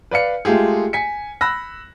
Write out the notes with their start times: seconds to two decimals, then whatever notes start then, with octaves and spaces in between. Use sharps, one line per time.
0.11 B4 D5 F5 C#7
0.45 G#3 A3 F4 G4 G#4
0.93 G#5 B6 C#7
1.41 B5 E6 F#6 A#6